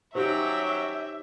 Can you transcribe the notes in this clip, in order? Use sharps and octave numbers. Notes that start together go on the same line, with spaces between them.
F#3 C#4 D#4 G4 C5 E5 G5